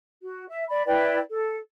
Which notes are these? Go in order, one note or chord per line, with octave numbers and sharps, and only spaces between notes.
F#4
E5
D5 B5
E4 B4 D5 G5
A4